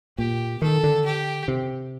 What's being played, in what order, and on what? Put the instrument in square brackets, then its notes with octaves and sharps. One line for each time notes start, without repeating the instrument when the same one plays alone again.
[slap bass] A#2 [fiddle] G4
[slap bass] D#3 [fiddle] A4
[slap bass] D3
[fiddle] G4
[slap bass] C3